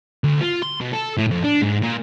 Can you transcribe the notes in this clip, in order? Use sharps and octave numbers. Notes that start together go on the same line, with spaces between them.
D2
F4
C6
B2
A4
A2
F2
D4
G#2
A#2